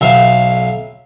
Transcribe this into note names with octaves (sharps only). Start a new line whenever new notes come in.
B1 E5 F5